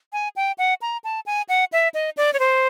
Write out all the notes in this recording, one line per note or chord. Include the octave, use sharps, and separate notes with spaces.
G#5
G5
F#5
A#5
A5
G#5
F#5
E5
D#5
D5
C#5
C5